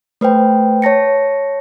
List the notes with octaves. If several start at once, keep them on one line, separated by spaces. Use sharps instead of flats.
A3 B4 C5 G5
C#5 A5 A#6 C#7